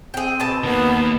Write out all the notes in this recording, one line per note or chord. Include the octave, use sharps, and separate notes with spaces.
C4 G#4 G5
B2 A5
D#3 A#3 B3